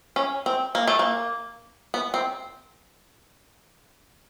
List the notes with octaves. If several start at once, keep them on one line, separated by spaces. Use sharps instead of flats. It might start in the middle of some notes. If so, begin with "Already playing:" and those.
C#4
C4
A#3
A3
A#3
B3
C4